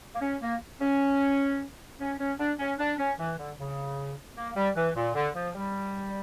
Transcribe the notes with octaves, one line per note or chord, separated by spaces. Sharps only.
A#3
C#4
A#3
C#4
C#4
C#4
D4
C#4
D4
C#4
E3
D3
C#3
A#3
G3
E3
A#2
D3
F3
G3